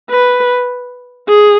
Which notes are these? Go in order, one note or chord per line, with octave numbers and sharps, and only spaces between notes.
B4
G#4